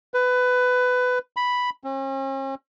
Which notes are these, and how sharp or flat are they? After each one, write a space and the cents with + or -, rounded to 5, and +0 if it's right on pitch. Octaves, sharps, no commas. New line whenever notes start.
B4 +20
B5 +0
C#4 -45